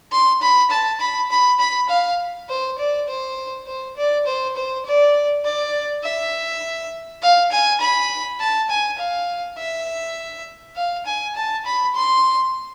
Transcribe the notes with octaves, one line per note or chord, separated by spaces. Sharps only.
C6
B5
A5
B5
B5
B5
F5
C5
D5
C5
C5
D5
C5
C5
D5
D5
E5
F5
G#5
B5
A5
G#5
F5
E5
F5
G#5
A5
B5
C6